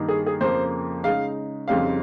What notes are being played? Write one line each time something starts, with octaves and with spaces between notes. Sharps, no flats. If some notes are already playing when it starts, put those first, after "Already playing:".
Already playing: G2 D#3 A#3 D#4
G#4
G#4
F2 C#3 F3 A#3 C5
C#3 G#3 D#4 F5
F2 C#3 G3 C4 D#4 F5